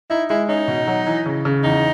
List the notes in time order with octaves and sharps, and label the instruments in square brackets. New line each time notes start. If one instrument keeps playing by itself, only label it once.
[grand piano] D#4 [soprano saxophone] E4
[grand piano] G#3 [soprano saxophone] E4
[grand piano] C#4 [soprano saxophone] D#4
[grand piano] B2
F#3
E3
C#3
C#3
[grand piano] E2 [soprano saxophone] D#4